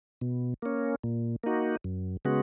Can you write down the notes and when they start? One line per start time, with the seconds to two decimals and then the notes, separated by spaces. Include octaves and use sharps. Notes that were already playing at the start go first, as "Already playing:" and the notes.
0.21 B2
0.62 A#3 C#4
1.04 A#2
1.43 A#3 D#4 F#4
1.84 F#2
2.25 C#3 G#3 B3 F#4